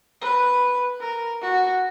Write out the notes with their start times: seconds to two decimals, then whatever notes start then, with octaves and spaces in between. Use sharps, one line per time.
0.21 B4
1.00 A#4
1.42 F#4